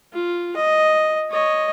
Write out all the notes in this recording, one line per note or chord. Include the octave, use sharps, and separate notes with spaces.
F4
D#5
C#5 D#5